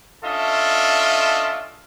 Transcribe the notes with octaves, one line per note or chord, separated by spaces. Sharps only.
C#4 D4 F4 A4 D#5 E5